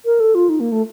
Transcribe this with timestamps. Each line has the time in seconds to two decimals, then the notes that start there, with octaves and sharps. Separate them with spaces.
0.05 A#4
0.20 A4
0.35 F4
0.49 D#4
0.60 A#3
0.72 A3